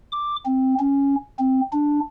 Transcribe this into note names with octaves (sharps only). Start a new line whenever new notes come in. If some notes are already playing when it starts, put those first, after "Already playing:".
D6
C4
C#4
C4
D4